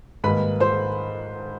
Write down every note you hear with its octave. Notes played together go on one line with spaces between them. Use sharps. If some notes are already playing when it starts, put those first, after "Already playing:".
G#2 D#3 G3 A#3 B4 B5
C5 C6